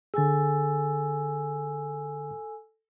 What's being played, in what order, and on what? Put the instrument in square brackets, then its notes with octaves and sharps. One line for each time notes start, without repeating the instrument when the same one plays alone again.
[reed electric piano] D3 G#4 [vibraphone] A4 G#5 E6